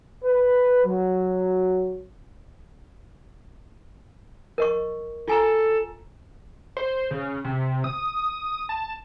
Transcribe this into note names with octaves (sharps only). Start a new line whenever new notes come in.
B4
F#3
A#4 D#5 C#6
F4 A4 G#5 A#5
C5
C#3
C3
D#6
A5